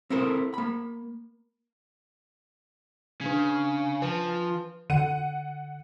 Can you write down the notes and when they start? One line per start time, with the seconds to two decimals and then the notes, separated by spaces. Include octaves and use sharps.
0.10 C4 E4 A4 A#4 C5
0.54 A#3 B5
3.21 C#3 D4 G#6
4.02 F3 B4
4.90 D3 F#5 D#7